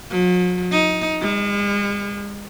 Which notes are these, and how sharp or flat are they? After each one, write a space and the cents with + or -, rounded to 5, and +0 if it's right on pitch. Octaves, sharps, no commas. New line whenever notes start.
F#3 -45
D#4 +15
G#3 -40